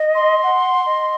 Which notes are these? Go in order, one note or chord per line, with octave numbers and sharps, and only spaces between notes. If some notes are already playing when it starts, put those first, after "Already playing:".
Already playing: D#5
C6
F#5
D#5